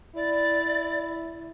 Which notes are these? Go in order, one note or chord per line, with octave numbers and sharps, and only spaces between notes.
E4 D5